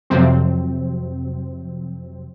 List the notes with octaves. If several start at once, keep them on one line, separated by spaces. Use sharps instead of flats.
F2 C3 F#3 C4